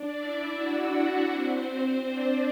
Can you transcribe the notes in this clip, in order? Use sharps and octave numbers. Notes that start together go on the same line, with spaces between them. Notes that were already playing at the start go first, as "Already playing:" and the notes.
Already playing: D4 D5
E4 E5
F#4 F#5
C4 C5
D4 D5